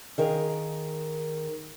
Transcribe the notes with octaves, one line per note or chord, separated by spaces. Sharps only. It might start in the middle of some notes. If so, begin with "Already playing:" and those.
D#3 G#4 A#4 F5